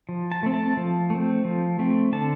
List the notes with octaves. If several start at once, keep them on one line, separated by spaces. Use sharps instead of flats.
F3
A5
A3 C4
A5
F3
A3 C4
F3
A3 C4
D3 A5